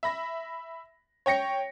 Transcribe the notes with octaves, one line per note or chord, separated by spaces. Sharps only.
E5 B5 A#6
C#5 G5 A#6 C#7